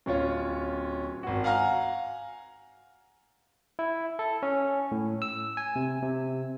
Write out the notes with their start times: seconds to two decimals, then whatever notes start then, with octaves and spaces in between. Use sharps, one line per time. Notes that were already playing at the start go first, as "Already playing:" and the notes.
0.06 D1 C#4 F4 C#5
1.23 G#1 F#4
1.44 F5 F#5 G#5 A#5 F6
3.79 E4
4.19 A4
4.43 C#4
4.92 A2
5.22 E6
5.57 G#5
5.76 C3
6.02 C3